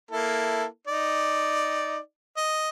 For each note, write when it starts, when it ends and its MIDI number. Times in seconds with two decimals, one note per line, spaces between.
0.11 0.65 58
0.11 0.65 64
0.11 0.65 69
0.87 1.98 63
0.87 1.98 74
2.37 2.69 75